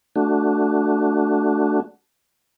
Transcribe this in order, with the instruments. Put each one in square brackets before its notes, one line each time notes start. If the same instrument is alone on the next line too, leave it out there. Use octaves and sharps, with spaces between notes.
[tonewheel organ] A3 D4 F#4